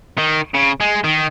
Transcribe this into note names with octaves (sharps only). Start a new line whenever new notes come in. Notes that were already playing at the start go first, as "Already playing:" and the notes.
D#3
C#3
G#3
D#3